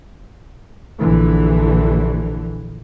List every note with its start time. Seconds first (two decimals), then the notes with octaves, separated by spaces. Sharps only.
1.00 A#1 D3 E3